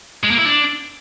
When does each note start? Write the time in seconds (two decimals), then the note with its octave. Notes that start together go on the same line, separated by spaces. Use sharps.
0.24 G#3
0.31 A#3
0.38 E4
0.45 D4